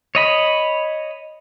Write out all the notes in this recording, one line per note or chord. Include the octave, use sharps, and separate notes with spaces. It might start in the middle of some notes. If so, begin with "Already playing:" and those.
C#5 D#5 B5